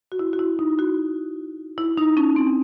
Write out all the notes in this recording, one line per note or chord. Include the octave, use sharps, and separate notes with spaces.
F#4
E4
F#4
E4
D#4
F#4
E4
D#4
C#4
C4